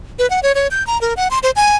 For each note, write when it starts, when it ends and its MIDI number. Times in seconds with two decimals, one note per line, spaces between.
0.19 0.29 71
0.30 0.40 78
0.43 0.52 73
0.55 0.67 73
0.71 0.85 91
0.87 1.00 82
1.01 1.14 70
1.17 1.28 78
1.31 1.39 84
1.43 1.51 72
1.56 1.77 80